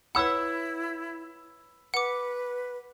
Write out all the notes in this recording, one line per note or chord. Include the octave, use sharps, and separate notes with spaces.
E4 B4 C#5 F#5 B5 E6
B4 F#5 D6